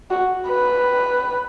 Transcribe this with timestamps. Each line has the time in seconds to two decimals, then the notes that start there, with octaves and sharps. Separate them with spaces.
0.10 F#4
0.48 B4